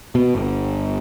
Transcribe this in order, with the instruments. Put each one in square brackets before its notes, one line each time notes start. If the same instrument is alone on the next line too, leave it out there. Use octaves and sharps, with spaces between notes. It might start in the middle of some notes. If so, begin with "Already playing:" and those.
[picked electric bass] B2
G1